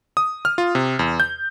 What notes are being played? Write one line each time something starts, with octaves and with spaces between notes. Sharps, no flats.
D#6
F6
F4
C3
E2
G6